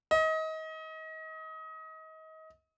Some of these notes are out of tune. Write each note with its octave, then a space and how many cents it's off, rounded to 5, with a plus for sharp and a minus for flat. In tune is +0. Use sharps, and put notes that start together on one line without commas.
D#5 +30